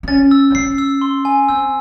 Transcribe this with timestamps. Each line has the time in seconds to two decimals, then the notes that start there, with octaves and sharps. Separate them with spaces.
0.03 C4
0.08 C#4 A6
0.31 E6
0.51 C4
0.55 C#4 C7
0.78 E6
1.01 C6
1.25 G#5
1.49 C4 E6